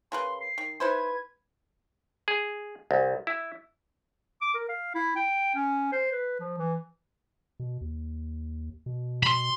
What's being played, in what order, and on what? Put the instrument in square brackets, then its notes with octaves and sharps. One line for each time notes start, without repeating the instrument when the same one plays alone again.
[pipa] C#3 A#4 B4 [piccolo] C6
[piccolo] C7
[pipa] D#3
[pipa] D#4 E4 C5 [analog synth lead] B4 [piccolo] G#6
[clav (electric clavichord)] G#4
C2
E4
[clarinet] D6
A#4
F5
E4
G5
C#4
C5
B4
F3
E3
[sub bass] B2
D#2
B2
[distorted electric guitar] B5 C6